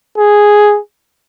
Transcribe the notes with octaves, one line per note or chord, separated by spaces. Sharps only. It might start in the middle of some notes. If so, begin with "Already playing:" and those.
G#4